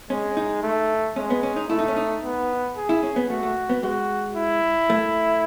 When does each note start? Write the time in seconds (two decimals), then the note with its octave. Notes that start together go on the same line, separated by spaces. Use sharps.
0.10 G#3 C#4
0.37 D#4
0.63 A3
1.16 G#3 C#4
1.30 B3
1.43 C#4
1.56 D#4
1.70 A3 E4
1.79 D#4
1.88 C#4
1.96 D#4
2.23 B3
2.76 G#4
2.89 E4
3.03 C#4
3.16 B3
3.30 A3 F#4
3.43 A3
3.69 B3
3.83 G#3 F#4
4.36 E4
4.90 A3